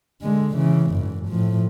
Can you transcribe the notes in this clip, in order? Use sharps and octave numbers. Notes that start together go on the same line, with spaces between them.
D3 G#3
C#3 E3
F#1 G#2
A2 F3